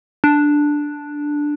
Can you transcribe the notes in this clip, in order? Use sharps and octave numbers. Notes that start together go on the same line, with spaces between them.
D4